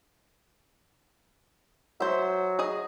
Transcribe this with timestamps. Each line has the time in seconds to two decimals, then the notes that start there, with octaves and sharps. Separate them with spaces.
2.00 F#3 C5 E5
2.59 G#4 D#5